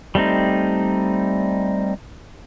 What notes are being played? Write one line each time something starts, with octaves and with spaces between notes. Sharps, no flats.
G3 A3 C4 D#4